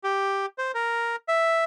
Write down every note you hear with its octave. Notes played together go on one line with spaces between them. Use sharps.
G4
C5
A#4
E5